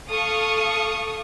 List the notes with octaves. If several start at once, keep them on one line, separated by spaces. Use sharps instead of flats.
A4 F5 C#6 D#6